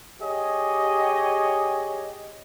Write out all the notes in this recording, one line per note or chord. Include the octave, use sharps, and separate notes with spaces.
G4 G#4 C#5 D#5